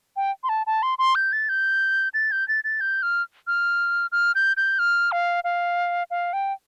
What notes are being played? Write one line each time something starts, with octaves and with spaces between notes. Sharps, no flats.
G5
C6
A5
A5
C6
C6
G6
A6
G6
A6
G6
A6
A6
G6
F6
F6
F6
G6
G6
F6
F5
F5
F5
G5